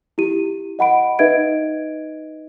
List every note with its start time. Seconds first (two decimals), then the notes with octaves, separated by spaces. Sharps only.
0.18 E4 G4 D#7
0.79 D#5 F#5 B5 D7
1.19 D#4 B4 D#5 E5 G#6 D7